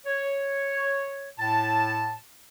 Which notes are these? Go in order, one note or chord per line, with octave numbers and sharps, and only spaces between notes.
C#5
A2 A5